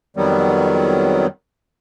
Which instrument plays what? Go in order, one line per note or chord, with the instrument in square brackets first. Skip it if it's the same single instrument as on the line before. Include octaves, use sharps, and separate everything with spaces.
[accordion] F2 D#3 F#3 G3 B3